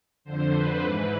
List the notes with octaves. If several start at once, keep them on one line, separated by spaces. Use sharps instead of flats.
F2 D3 C5
B4
G#2 E3 B4